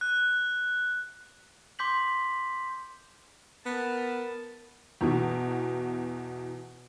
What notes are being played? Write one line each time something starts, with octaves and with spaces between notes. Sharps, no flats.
F#6
C6 D6 G6 B6 F#7
B3 A#4 A5
E2 B2 E3